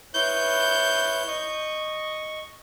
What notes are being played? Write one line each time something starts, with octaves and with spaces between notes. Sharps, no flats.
E4 B4 C#5 G6
D#5 C#6